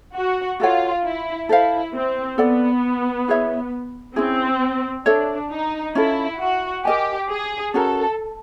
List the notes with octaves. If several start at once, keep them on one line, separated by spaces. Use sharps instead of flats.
F#4
F4 F#4 A4 C#5 F#5
E4
E4 A4 C5 F5
C4
B3 A4 D5 F#5
E4 G#4 C#5 E5
C4 C#4 E4 G#4
D4 A4 C#5 E5
D#4
C#4 E4 F4 A4
F#4
G4 A#4 D#5 G#5
G#4
C#4 F#4 A4 A#4